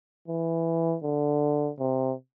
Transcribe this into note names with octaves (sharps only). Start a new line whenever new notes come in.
E3
D3
C3